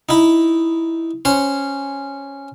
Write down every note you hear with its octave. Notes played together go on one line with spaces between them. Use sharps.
D#4 E4
C#4 C5